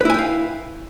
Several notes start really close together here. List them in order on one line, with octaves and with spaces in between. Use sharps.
B4 E4 G#5 G5 F5